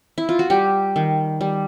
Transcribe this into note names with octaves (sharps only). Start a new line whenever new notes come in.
E4
F4
F#4
G3 G4
D#3
G3